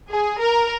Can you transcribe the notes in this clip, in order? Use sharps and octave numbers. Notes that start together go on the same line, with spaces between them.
G#4
A#4